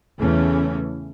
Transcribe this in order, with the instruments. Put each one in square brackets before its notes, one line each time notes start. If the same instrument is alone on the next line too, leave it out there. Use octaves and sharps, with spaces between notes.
[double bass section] E2 C#3 E3 A3 C#4